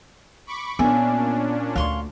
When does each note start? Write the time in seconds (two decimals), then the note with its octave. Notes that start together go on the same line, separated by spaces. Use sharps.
0.47 B5 C#6 D6
0.79 A#2 B3 C#4 D4 G#4 E5
1.76 D2 F5 C6 C#6